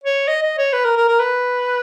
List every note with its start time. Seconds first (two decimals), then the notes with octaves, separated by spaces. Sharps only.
0.04 C#5
0.28 D#5
0.43 D#5
0.58 C#5
0.73 B4
0.85 A#4
0.97 A#4
1.08 A#4
1.19 B4